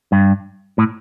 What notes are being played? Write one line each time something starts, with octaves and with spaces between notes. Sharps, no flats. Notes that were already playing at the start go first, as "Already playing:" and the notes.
G2
A2